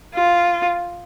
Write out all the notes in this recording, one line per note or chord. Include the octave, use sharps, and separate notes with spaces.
F4